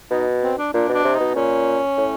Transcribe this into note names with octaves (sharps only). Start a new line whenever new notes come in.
B2 D#4
C4
D4
A#2 D4
B2
D4
C3
D#4
B2
A#2 C#4
A2